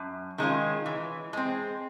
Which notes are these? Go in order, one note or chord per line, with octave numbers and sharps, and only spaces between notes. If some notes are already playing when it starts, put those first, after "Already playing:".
Already playing: F#2
D#3 G#3 C#4 F4
E3
G#3 C4